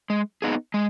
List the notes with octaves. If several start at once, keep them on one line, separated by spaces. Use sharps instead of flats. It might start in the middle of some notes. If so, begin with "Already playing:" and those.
G#3
B3 D#4 G#4
G#3